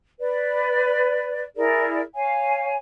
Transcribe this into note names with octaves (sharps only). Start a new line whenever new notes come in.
B4 D5
E4 G#4 A#4 D5
C#5 F5 G#5